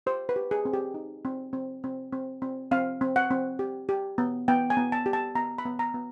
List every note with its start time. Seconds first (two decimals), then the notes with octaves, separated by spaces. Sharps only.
0.06 G4 C5
0.29 B4
0.36 G4
0.51 G#4
0.65 C4
0.74 G4
0.94 D#4
1.25 C4
1.53 C4
1.84 C4
2.13 C4
2.42 C4
2.71 C4 F5
3.01 C4
3.16 F#5
3.31 C4
3.59 G4
3.89 G4
4.18 B3
4.48 B3 G5
4.70 G#5
4.77 B3
4.92 A5
5.06 G4
5.13 A5
5.35 B3 A#5
5.58 B5
5.65 B3
5.79 A#5
5.94 B3